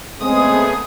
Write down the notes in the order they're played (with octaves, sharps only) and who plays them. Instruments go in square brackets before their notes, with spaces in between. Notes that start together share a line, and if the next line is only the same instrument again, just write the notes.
[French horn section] C#3 G#3 C4 [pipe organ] A3 B3 G#4 [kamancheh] D#6